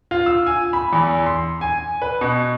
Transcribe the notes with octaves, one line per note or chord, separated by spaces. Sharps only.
F4
E6
G#5
B5
E2
C6
G#5
B4
B2